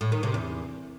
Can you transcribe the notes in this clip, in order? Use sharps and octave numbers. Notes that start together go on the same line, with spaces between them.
A2
D#3
C3
E2